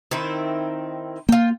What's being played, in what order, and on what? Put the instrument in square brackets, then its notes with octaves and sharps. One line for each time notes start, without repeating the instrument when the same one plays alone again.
[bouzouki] D#3 C4 E4
[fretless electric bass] A#3 [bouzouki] F4 G5